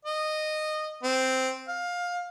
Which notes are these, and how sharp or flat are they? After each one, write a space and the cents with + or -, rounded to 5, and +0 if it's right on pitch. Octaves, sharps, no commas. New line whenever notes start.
D#5 -15
C4 -5
F5 +20